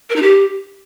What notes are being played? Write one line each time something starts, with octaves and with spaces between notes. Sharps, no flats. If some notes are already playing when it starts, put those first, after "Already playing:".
A#4
D#4
G4